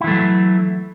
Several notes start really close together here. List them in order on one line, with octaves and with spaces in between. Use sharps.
E4 E3 A3 F#3